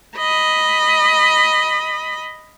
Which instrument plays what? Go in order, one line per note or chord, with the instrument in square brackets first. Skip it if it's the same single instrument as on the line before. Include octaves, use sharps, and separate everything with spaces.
[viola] D#5 B5